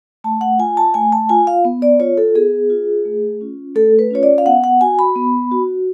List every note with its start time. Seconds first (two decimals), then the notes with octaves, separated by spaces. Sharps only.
0.24 A3 A5
0.41 F#5
0.59 F4 G#5
0.77 A5
0.94 A3 G#5
1.12 A5
1.29 F4 G#5
1.47 F5
1.65 B3
1.82 D5
2.00 F4 C#5
2.17 A4
2.35 B3 G#4
2.70 F4
3.05 A3
3.41 C#4 F4
3.75 A3 A4
3.99 B4
4.10 C#4 F4 C#5
4.23 D5
4.38 F5
4.46 B3 F#5
4.64 F#5
4.81 F#4 G#5
4.99 B5
5.16 B3
5.52 F#4